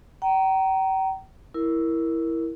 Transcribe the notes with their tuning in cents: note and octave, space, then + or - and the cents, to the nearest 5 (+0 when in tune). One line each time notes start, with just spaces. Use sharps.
G5 -40 A#5 +0
E4 +0 A#4 +0